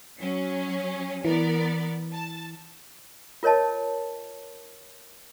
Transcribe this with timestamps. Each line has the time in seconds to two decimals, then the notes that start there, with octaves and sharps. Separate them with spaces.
0.17 F#3 C#4
1.25 E3 B3 A#4 D5
2.13 A5
3.43 F4 A#4 C#5 D#5 A5